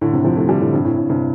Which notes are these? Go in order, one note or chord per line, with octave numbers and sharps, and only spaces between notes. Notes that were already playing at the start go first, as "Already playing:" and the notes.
A2 D3
G2 C3
C3 F3
F3 A3
D3 G3
A2 D3
G2 C3
A2
A2
G2 C3